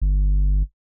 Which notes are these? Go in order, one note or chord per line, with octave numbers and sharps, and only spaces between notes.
G1